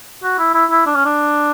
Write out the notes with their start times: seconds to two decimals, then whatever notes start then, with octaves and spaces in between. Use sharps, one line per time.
0.24 F#4
0.39 E4
0.54 E4
0.71 E4
0.86 D4
0.95 C#4
1.05 D4